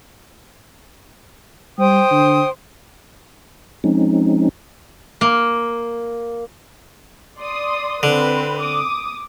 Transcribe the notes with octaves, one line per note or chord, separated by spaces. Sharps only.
G3 C5 G5 D#6
D3
F3 G#3 C4 C#4 D#4
A#3
D5 C6 D#6
D3 C4 B4
D6 D#6